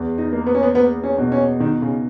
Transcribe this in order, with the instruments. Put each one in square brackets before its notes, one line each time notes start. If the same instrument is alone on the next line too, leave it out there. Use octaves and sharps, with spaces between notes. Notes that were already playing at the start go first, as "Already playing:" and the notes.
Already playing: [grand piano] E2
[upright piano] D#4
[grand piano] A#3
[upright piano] B3
C#4
B3
[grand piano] A#3 [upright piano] B3
[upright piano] C#4
[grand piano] B2
[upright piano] C#4
[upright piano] D#3 [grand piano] D#4
[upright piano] C#3